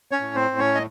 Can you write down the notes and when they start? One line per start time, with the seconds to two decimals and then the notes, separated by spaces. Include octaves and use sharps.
0.11 C#4 C#5
0.20 A2
0.35 C4 C5
0.51 A2
0.59 C#4 C#5
0.75 D#5